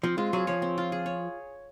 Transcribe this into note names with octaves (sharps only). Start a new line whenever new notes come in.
F3 C4
G#3 F4
F#3 G#4
F3 C#5
C4
F4
G#4
C#5